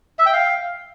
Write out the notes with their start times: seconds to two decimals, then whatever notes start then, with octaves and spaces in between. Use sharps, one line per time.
0.19 E5
0.26 G5
0.33 F5